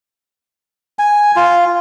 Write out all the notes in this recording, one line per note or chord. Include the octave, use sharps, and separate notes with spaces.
G#5
F4